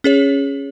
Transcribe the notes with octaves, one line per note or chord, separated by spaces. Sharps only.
C#4 G#4 C#5